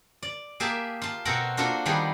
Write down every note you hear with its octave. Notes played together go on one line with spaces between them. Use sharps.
D5
A#3 G4 G#4 E5 A5
F4 A5
B2 C4 F#4 A4 A#4 F#5
A#3 D4 F4 F#4 A4
D#3 G3 B3 D4 G4 G#4